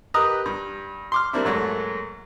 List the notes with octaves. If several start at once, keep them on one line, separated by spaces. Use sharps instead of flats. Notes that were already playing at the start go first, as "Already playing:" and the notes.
G4 A#4 B4 D#5 A#5 D#6
G2
C6 D6 F6
G3 A#3 C4 D4 E4
G#2 F#3 A3 A#3